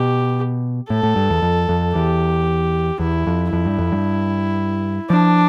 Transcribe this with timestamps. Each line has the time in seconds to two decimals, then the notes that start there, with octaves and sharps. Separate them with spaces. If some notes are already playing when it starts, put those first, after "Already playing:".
Already playing: B2 G4
0.90 A2 A4
1.03 A2
1.16 G2
1.30 E2
1.42 F2
1.69 F2
1.95 E2 G4
3.00 E2 E4
3.27 F2
3.52 F2 E4
3.66 G2
3.78 F2
3.92 G2
5.10 F3 D4